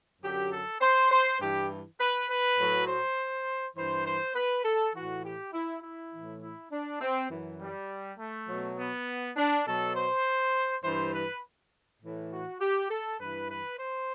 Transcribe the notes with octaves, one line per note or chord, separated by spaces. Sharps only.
F#2 D3 F#3 G4
A4
C5
C5
G2 E3 G4
B4
B4
A2 F#3
C5
G2 E3 C5
C5
B4
A4
A2 E3 F#4
G4
E4
E4
A2 E3
E4
D4
C4
F#2 E3
G3
A3
B2 F#3
B3
D4
B2 F#3 A4
C5
G2 E3 C5
B4
A2 E3
F#4
G4
A4
G2 E3 B4
B4
C5